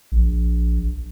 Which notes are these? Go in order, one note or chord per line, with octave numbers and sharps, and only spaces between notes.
A#1